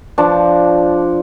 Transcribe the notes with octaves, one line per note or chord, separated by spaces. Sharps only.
F3 D4